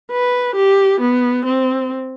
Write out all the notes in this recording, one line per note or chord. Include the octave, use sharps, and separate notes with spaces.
B4
G4
B3
C4